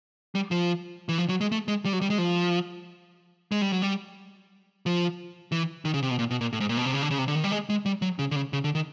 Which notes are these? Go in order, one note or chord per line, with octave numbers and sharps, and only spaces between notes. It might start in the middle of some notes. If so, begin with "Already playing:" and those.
G3
F3
E3
F3
F#3
G#3
A3
G#3
G3
F#3
G3
G#3
F3
G#3
G3
F#3
G3
F3
E3
D#3
C#3
C3
B2
A#2
B2
A#2
A2
G#2
A#2
B2
C3
C#3
D3
C#3
C3
D3
D#3
G3
G#3
G#3
G3
F#3
C#3
D3
C#3
C#3
D3
D#3